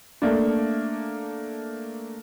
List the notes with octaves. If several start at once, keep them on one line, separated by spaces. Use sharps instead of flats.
A3 A#3 D4